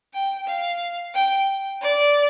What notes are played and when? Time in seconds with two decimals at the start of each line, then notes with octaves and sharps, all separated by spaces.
0.14 G5
0.47 F5
1.14 G5
1.81 D5